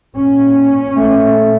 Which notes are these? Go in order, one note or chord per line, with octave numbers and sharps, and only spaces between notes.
A#2 C#4
A3